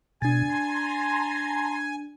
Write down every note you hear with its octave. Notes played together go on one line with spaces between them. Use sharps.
B2 D4 G#5 A6
A5 A#5 C6